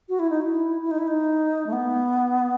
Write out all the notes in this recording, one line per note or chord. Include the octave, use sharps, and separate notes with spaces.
F#4
E4
D#4
E4
E4
D#4
E4
D#4
A3
B3